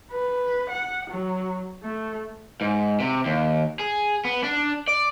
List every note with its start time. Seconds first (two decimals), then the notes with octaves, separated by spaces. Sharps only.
0.12 B4
0.70 F#5
1.10 F#3
1.83 A3
2.61 G#2
3.00 C3
3.25 D#2
3.79 G#4
4.25 B3
4.44 D4
4.88 D5